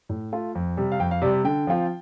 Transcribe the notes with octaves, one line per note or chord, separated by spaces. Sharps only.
A2
A3 F4
F2
C3 G3
F5
F2 G5
F5
C3 G3 D5
D3 G5
F3 C4 F4